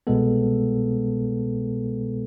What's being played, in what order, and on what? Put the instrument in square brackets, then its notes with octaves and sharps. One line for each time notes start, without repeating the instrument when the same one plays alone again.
[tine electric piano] C2 B2 G#3 B3 A4